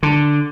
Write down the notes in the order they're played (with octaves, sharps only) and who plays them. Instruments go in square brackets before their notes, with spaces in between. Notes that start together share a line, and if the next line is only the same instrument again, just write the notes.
[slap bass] D3